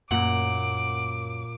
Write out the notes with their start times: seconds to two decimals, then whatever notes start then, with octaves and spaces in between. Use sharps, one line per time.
0.11 F#2 A#2 F#5 D6